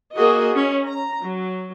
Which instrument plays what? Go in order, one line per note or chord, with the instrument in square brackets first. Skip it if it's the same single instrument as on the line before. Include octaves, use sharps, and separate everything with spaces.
[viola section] A#3 F#4 G#4 A#4 D#5
C#4
A#5
F#3